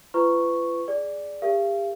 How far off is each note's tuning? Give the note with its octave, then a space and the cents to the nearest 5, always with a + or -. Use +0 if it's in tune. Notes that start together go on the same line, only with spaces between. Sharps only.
F4 -40 B4 +25 C#6 +0
G#4 +0 D5 +0
G4 +35 A#4 -40 F5 -40